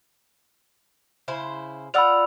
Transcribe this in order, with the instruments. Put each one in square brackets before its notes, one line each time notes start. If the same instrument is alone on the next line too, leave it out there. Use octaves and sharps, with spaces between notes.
[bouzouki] C#3 E4 C5
[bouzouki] F4 D5 F#5 [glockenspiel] B5 E6 F7